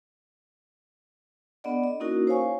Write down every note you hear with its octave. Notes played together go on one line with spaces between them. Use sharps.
B3 D4 A4 D5 D#5 F#5
D#5
A#3 C#4 D#4 E4 F#4 A#4
C5 C#5 F5 G#5 C#6